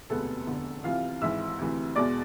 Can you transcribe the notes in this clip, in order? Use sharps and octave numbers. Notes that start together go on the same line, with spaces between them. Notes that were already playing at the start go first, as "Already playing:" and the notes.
E1 D2 C3 G#3 B3 A4
F1 E2 D3
C2 C3 E3 F4 F5
G#1 G#2 E3 E5 E6
D2 C3 E3
E2 B2 G#3 D5 D6